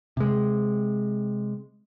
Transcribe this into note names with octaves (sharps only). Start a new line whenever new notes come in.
C3 G#3